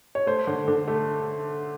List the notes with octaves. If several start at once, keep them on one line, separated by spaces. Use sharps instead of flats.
C#5
A3 C5
D3
D3
A3